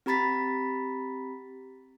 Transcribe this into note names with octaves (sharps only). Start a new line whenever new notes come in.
C4 G4 A#5 B5 A6 B6